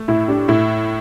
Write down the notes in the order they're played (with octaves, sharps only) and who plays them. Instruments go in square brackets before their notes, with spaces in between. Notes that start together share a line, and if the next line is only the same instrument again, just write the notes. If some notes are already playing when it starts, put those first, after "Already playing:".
Already playing: [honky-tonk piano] A3
[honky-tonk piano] A2 [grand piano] E4
[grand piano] D4 G4
[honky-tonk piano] A2 [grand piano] E4